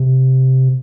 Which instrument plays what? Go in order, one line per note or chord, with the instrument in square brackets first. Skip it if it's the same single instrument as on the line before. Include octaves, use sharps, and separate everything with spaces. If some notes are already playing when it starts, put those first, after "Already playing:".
Already playing: [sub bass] C3